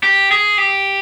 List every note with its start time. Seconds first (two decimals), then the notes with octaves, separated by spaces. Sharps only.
0.04 G4
0.31 G#4
0.58 G4